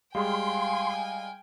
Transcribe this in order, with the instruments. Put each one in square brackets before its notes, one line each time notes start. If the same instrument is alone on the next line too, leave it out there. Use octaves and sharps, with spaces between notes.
[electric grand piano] G3 G#3 G#4 [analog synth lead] F5 [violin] G5 G#5 [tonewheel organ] C6